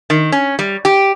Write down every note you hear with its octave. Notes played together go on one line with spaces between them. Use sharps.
D#3
C#4
G3
G4